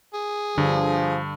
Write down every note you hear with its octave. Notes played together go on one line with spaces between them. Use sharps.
G#4
G2 D3 F3